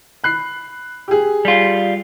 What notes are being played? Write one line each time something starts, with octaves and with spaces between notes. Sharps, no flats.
B5 F#6 C7
G4 G#4
G3 F4